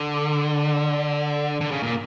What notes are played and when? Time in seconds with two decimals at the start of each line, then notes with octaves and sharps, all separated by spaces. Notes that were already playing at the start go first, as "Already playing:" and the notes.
Already playing: D3
1.61 D3
1.71 C#3
1.83 A#2